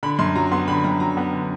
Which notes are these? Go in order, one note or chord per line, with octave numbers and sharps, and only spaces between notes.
D3 B5
F#2 C6
F#3 A#5
B3 C6
D3 B5
F#2 A#5
F#3 A#5
B3
D3